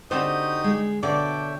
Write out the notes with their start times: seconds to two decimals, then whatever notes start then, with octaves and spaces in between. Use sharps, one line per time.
0.11 D3 C4 D#4 F#4 G4 A4 C5
0.64 G#3
1.03 B2 D3 A4 C#5 D5 E5 G5